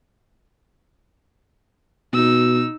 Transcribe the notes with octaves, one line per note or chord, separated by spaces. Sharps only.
B2 D#4 E6